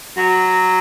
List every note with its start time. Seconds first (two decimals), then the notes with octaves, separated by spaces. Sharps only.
0.16 F#3